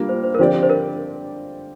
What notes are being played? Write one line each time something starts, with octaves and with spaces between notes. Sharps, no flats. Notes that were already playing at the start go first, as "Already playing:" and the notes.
Already playing: G3 A#3 D4 F4
C5
C5
A#4
D3 F3 C4 G4 C5 D5
C5
A#4